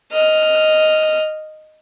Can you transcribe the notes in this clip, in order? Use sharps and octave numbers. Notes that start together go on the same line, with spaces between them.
D#5 F6